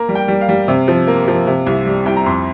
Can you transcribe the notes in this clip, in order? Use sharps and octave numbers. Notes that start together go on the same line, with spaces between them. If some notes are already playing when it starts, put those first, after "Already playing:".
Already playing: A#3 A#5
G3
G5
G3
F5
G3
C3
F3
A#3
F3
C3
C2
G3
C2 G5
A#5
F2 C6